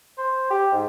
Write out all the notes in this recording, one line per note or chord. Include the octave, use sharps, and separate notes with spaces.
C5
G4
G#2